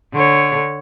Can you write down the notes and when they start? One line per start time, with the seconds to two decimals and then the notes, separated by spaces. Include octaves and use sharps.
0.13 D3 C#5